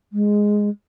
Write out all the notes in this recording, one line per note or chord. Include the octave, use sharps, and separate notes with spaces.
G#3